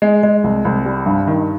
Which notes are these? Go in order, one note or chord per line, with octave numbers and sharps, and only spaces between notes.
G#3
G#3
C2
C2
G3
G2
D#3